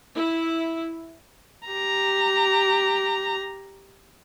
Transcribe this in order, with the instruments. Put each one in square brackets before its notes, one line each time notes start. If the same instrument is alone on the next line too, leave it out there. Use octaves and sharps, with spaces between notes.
[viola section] E4
[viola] G4 A#5